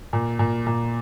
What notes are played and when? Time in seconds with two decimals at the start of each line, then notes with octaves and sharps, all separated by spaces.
0.13 A#2
0.39 A#2
0.67 A#2